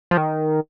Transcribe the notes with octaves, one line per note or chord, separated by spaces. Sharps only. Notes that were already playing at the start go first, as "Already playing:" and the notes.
F3
D#3